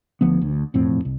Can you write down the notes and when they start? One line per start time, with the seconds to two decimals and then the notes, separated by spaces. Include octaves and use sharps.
0.21 D2 F3 B3
0.41 D2
0.74 E1 F2 A2 C4
1.05 C2